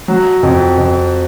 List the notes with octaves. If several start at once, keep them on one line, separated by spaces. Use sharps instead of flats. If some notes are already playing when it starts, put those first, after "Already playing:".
F#3
F2
F2